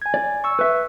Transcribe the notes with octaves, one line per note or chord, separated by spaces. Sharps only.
G#5 G#6
D5
C#6 E6
B4 E5